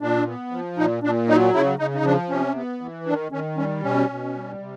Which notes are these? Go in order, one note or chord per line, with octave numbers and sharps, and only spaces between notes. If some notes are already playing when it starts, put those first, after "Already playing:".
A#2 D4
B3
F3
A#2 D#4
A#2 D4
F#3 D#4
C#3 E4
C#3 D#4
D#4
F3 D4
C3 C#4
B3
E3
D#3 D4
D#3 C#4
G3 C#4
B2 C#4
B2
G3
C3